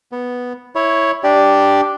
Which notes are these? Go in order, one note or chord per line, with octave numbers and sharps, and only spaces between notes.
B3
E4 C#5
D4 G4 D5